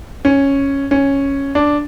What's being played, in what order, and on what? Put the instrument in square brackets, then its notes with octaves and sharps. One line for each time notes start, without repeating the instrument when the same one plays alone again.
[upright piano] C#4
C#4
D4